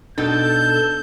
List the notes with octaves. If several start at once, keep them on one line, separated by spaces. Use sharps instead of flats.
B2 D4 D#4 A4 G6